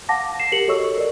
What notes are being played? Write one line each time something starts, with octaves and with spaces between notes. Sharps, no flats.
F5 F#5 A5 D6 A#6
C7 E7
G4 A#4 C#7 F#7
F#4 A4 C#5 D#5 C#6 E6
A#4 D5